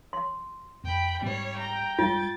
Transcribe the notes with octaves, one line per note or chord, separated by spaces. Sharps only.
C6
F2 G5 B5
G#2 G3 G#3 C4 C#5
G5 A#5
G2 G#3 F4 A6